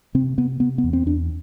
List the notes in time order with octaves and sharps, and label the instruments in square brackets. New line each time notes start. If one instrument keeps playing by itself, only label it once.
[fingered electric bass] C3 C4
C3 B3
C3 B3
B3
E2
C4
E2 D4